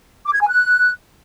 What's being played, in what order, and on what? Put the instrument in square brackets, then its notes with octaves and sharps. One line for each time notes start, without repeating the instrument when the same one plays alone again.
[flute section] D6
G#6
G#5
F#6